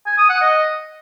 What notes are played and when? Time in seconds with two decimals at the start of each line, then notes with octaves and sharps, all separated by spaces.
0.06 G#5
0.18 D#6
0.30 F#5
0.41 D#5